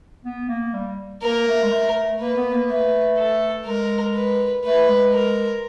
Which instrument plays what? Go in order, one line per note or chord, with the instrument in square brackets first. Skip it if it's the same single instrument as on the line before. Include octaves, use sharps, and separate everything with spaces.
[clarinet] B3
A#3
G3
[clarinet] A#3 [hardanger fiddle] A#4
[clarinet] A3
G#3
A3
[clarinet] A#3 [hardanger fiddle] B4
[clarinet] B3
A#3
[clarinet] A3 [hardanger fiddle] B4
[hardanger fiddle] A4
[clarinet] G#3 [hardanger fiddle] A#4
[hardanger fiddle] B4
[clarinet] A3 [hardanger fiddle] B4
[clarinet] G#3
[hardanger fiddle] A#4